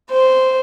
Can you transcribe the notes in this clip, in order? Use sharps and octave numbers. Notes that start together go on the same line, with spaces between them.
C5